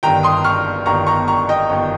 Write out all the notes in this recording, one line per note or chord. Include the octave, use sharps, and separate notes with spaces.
G1 G2 D#3 G5 A#5
C6 D#6
C#6 F6
G1 G2 D#3 A#5 C#6
A#5 C#6
A#5 C#6
D#5 G5
G1 G2 D#3